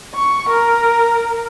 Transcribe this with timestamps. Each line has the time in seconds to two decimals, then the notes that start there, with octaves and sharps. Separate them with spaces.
0.15 C#6
0.50 A#4